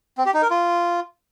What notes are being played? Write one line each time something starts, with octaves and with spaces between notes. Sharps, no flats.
C4
G4
D#4
A#4
F4